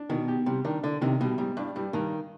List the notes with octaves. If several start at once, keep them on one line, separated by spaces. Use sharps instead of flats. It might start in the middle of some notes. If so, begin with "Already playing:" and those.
Already playing: D4
B2 D#3
G4
C3 G3
D#3 D4
D3 D4
C3 D#3
B2 G3
G#2 G3
G2 D4
G2 G3
G2 D#3